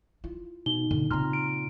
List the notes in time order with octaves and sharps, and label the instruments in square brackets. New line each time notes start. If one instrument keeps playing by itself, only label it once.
[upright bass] E4 F4
[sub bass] B2 [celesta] D#4 G7
[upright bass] A#2 [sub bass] D3
[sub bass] A#2 [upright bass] C#3 C4 [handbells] A#5 C6 F6
[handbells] D7